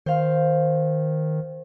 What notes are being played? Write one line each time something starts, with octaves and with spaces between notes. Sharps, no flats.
D#3 C5 F5